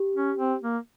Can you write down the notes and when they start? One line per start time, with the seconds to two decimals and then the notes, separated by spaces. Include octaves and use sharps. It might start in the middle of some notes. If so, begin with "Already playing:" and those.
Already playing: G4
0.15 C#4
0.38 C4
0.62 A#3